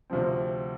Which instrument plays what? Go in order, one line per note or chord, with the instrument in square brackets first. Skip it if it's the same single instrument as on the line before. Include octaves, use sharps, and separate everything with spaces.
[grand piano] D2 C3 F3 C4